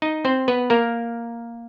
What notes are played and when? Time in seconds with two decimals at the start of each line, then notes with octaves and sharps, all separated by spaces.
0.02 D#4 D#5
0.25 C4 C5
0.48 B3 B4
0.70 A#3 A#4